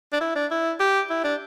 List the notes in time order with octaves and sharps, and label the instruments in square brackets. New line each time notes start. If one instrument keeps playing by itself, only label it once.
[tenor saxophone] D4
E4
D4
E4
G4
E4
D4